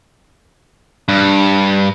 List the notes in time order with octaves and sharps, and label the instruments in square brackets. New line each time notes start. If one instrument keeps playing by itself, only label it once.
[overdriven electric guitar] G2